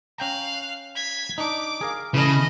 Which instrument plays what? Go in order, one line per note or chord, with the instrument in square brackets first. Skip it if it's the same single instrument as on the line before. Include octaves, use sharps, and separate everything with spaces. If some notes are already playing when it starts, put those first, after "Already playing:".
[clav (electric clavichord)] C#4 G5 A#5 [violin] F5 F#6
[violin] G#6 B6
[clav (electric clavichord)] D4 D#4 [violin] D6
[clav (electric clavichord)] G#4 A#4 F5
[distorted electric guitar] C#3 [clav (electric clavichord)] E3 A3 [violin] D#5 B5